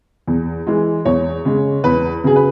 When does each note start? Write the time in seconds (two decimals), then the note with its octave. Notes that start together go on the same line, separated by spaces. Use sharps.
0.28 E2
0.67 E3 G#3
1.05 E2 C#5
1.45 C#3 G#3
1.84 E2 B4
2.24 C#3 F#3 G#4
2.36 B4